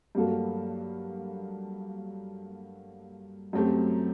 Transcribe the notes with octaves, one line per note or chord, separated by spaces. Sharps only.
G2 F#3 A#3 F#4 A4
F#2 F#3 A3 C4 G4